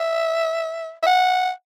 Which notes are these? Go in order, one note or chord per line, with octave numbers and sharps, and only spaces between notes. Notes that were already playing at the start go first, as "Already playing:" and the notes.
Already playing: E5
E5
F#5